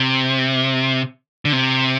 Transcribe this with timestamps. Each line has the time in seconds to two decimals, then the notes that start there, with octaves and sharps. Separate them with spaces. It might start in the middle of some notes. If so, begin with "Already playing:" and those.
Already playing: C3
1.45 D3
1.52 C3